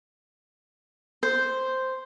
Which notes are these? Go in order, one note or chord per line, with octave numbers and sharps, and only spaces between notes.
C5